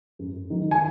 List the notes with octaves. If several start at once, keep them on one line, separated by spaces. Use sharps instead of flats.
F#2
D#3 F#3
G#5